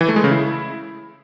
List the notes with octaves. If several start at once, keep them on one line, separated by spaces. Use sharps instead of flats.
E3
A3
G#3
C#3
E4